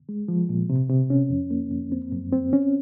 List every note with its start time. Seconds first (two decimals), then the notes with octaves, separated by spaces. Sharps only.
0.09 G#3
0.28 F3
0.49 A#2
0.70 C3
0.90 C3
1.10 C#4
1.30 F2
1.51 A#3
1.71 F2
1.92 C4
2.12 F#2
2.32 C4
2.53 C#4